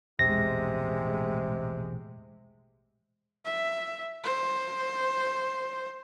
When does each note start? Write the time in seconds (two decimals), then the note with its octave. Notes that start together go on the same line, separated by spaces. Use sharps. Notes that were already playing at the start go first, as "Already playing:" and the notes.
0.19 E1 A#1 E2 A2 C3 G#3 A#6
3.45 E5
4.23 C5